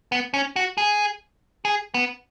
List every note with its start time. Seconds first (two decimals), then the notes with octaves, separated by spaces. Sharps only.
0.12 B3
0.34 C#4
0.56 F#4
0.78 G#4
1.65 G#4
1.94 B3